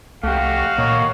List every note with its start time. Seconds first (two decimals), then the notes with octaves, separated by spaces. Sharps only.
0.23 C2 A3 F#4 G4 F5
0.78 A#2 A#3 C#5 D#5